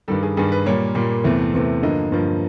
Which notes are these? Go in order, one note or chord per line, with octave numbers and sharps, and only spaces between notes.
G2 D#3 G3 A4
G#4
G2 D#3 G3 G#4
B4
A#2 G3 A#3 C#5
A#2 G3 A#3
E2 C3 E3 A3
E2 C3 E3 A3
G2 D3 F3 A#3 D#5
G2 D3 F3 A#3